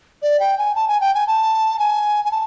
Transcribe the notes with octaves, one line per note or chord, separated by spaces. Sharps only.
D5
G5
G#5
A5
G#5
G5
G#5
A5
G#5
G#5
A5